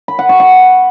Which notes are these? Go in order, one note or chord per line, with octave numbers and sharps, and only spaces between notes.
B5
F#5
C#6
F#5